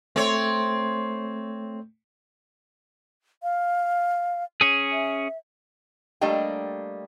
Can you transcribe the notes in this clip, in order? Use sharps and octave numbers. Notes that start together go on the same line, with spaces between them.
A3 C4 C#5
F5
C#4 G#4
E5
G3 A3 A#3 D4 D#5 G5